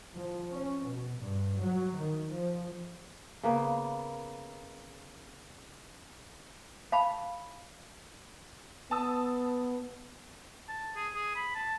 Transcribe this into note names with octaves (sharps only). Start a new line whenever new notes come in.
F3
C#4
B2
G2
F#3
D#3
F3
C#3 A#3 B3
F5 A5 B5
B3 A5 D#6 E6
A5
G#4
G#4
B5
A5